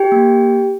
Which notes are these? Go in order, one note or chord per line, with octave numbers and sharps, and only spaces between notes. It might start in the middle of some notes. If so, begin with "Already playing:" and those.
Already playing: G4 G5
A#3